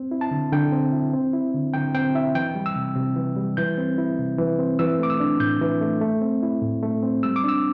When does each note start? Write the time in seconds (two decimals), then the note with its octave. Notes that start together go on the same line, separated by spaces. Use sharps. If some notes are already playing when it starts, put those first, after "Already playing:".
Already playing: C4
0.11 E4
0.21 A5
0.31 D3
0.52 D3 G5
0.72 C4
0.93 E4
1.13 C4
1.33 E4
1.54 D3
1.74 D3 G5
1.95 C4 G5
2.15 E4 E5
2.35 E3 G5
2.55 G3
2.66 E6
2.76 C3
2.96 C3
3.16 E3
3.37 G3
3.57 E3 G6
3.78 C4
3.98 E4
4.19 C3
4.38 E3
4.59 C4
4.79 E3 E6
4.99 A3 D6
5.10 E6
5.20 D4
5.40 A2 G6
5.61 E3
5.81 A3
6.01 A3
6.21 C4
6.43 E4
6.62 A2
6.83 A3
7.03 C4
7.23 G3 E6
7.36 D6
7.44 D4 E6